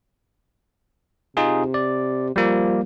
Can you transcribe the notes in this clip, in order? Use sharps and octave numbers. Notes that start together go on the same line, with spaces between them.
C3 D#4 F4 G#4
D5
F3 G3 A#3